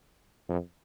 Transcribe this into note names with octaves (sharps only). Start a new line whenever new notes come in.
F2